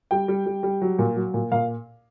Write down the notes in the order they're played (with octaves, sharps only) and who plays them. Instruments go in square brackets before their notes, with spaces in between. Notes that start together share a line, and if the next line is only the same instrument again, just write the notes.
[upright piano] G3 G5
G3
G3
G3
F#3
A#2
F#3
A#2
A#2 F5